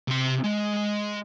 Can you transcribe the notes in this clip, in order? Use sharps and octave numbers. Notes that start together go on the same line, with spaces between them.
C3 C6
G#3